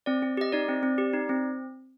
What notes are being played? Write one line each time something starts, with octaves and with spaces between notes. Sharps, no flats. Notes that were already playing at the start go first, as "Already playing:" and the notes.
C4 D5
C4
G4 D#5
D#4 D5
C4
C4
G4
D#4
C4